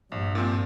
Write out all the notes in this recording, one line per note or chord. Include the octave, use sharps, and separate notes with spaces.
A#1 G2
A#2 F3 C4